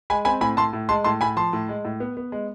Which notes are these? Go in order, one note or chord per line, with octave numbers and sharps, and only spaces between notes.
G#3 G#5 B5
C4 G#5 B5
A2 G#5 B5
A2 A5 C6
A2
G#3 A5 C6
A2 A5 C6
A2 G#5 B5
F3 A5 C6
A2
G#3
A2
B3
B3
G#3